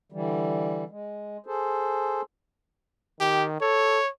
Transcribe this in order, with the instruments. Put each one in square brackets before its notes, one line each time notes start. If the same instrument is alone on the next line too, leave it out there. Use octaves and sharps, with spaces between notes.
[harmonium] D3 E3 G3
G#3
G#4 A4 C5
[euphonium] D#3 [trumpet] G4
[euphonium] A4 [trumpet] C#5